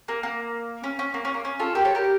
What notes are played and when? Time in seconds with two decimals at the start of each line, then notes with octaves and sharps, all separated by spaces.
0.08 A#3
0.23 A#3
0.84 C#4
0.99 C#4
1.14 A#3
1.25 C#4
1.34 A#3
1.45 C#4
1.60 F4 A4
1.75 G4 A#4
1.85 A4 C#5
1.95 G4 A#4